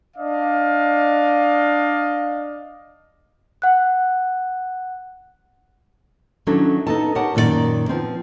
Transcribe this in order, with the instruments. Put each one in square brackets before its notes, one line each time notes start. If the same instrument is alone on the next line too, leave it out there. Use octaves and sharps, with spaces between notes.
[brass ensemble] D4 D5 D#5 F5
[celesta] F#5 F#6
[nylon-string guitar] D#3 F#3 C#4 D4 E4 A4
B3 D#4 A4 A5
G4 A#4 C#5 F#5 A5
F#2 A#2 D#3 F4 D5
F3 B3 C4